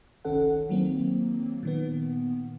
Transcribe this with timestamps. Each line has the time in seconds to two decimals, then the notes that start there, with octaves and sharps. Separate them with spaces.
0.25 G1 C2 D#3 C#4 A4 F#5
0.69 D#3 F#3 A#3 C4
1.63 A#2 D#3 B3